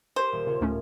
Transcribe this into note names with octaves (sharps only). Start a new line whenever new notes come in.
G4 A#4 C5
D#1
C#3 F4 A#4 C#5
D2 A2 A3 C#4